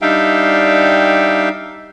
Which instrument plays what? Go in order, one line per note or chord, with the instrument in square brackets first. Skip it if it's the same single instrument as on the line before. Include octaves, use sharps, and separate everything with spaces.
[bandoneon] G3 D4 D#4 E5 F5 G5